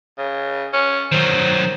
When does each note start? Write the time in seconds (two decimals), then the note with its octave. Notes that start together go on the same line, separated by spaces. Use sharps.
0.18 C#3
0.73 C#4
1.12 D#3 F#3 C5